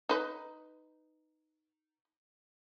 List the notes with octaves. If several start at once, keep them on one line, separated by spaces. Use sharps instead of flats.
D#4 B4